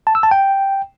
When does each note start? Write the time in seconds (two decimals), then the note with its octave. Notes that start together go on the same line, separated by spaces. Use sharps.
0.07 A5
0.15 E6
0.23 A5
0.31 G5